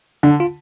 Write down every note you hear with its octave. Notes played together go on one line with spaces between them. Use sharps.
D3 D4
F4